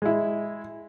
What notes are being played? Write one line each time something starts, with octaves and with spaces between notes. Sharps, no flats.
G#3 E4